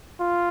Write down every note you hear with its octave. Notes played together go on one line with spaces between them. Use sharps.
F4